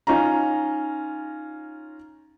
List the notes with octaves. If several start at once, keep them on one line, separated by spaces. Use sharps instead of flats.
C#4 D#4 F4 A#5